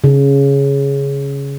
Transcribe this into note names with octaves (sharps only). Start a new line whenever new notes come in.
C#3